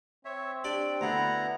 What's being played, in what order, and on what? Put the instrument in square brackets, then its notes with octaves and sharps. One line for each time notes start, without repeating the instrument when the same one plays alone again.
[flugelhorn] C4 [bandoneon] C#5 E5
[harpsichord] D4 G4 D5 [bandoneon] G5
[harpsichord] D2 D3 [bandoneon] B3 E4 A#5 [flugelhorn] F#5